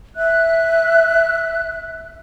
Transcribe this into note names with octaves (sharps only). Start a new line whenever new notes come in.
E5 F#6